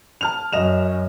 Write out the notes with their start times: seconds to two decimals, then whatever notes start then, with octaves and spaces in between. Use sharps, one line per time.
0.21 A5 F6 F7
0.52 F#2 D#5 E7 F7